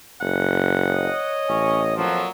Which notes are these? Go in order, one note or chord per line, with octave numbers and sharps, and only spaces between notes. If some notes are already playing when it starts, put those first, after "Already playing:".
F#1 F#5
C#5 D#5
A1 C#4
F2 A#2 F3 F#3